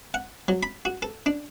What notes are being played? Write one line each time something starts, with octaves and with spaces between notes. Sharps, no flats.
F#5
F#3
B5
F#4
A4
D4